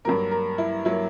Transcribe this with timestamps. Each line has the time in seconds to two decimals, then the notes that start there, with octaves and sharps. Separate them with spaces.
0.05 G2 F#3 A#3 A#4
0.31 A#4
0.58 E4
0.85 F#3 A#3 E4